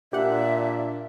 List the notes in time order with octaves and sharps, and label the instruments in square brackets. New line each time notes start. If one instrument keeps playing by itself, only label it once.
[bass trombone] A#2 [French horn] D4 [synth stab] G4 F#5 [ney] E5